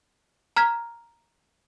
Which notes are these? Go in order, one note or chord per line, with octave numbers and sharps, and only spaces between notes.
A#5 F6 G#6 B6